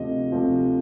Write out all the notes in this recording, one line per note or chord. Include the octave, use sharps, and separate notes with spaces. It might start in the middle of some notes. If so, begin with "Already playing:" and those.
Already playing: D2 C3 F3 D#5
D2 C3 F3